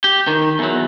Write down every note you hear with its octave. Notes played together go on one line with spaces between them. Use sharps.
G4
D#3
E2 F#3